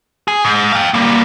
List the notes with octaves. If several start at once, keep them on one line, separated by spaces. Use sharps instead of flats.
G#4
G#2
F5 G5
G3 A#3